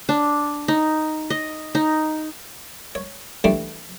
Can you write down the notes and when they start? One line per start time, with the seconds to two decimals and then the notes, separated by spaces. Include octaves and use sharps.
0.09 D4
0.68 D#4
1.30 D#5
1.75 D#4
2.95 C#5
3.44 E3 G3 A3 D4